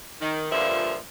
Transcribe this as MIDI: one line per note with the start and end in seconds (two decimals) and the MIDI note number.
0.20 0.48 51
0.51 0.96 43
0.51 0.96 46
0.51 0.96 50
0.51 0.96 53
0.51 0.96 65
0.51 0.96 76